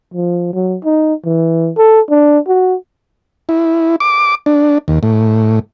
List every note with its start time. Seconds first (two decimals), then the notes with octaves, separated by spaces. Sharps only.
0.14 F3
0.53 F#3
0.85 D#4
1.25 E3
1.77 A4
2.10 D4
2.48 F#4
3.49 E4
4.00 D6
4.46 D4
4.88 D#2
5.03 A2